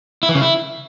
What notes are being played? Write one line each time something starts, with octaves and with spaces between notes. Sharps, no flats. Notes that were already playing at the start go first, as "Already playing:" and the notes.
E4
E3
C#3
E4